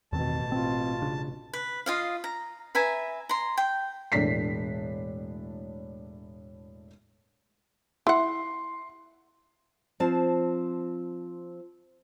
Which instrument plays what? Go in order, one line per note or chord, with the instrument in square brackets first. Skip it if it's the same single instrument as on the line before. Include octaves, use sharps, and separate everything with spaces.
[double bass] A1 B2 [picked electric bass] E2 D#3 C4 [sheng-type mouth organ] A5
[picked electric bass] C4 [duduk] F4
[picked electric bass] C#3 D4
[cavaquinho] B4
F4 D#5 F5
A#5
B4 E5 G#5 A#5
A#5 C6
G5
[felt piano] E1 A2 D4 B6 C7
[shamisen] E4 F#5 [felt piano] C6
[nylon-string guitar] F3 C4 A5